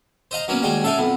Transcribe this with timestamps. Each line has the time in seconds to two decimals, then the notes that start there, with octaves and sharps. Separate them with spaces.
0.31 C5 D#5 F5 A#5
0.48 F#3 A#3 B3 C#4
0.62 D#2 G3 G#3 F#4 G5 G#5
0.83 F#2 A4 E5 F5 G5 G#5
0.98 B1 F2 B3